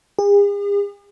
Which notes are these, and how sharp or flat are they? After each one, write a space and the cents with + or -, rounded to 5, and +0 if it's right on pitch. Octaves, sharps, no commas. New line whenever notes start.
G#4 -45